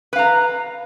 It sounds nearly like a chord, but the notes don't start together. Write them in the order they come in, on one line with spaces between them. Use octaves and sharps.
B4 F5 A#5